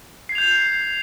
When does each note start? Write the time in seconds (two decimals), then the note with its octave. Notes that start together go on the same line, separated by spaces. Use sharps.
0.29 C7
0.32 G#6
0.35 F7
0.38 G6